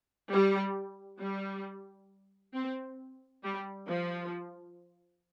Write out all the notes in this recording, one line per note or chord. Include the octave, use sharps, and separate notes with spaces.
G3
G3
C4
G3
F3